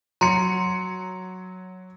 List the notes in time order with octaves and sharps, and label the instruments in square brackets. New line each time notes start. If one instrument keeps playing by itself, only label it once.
[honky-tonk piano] F#3 C#7 [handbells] A#5 C6